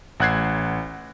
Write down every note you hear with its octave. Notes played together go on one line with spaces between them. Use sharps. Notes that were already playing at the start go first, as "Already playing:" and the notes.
A1 F#5 F#6 G#6 C7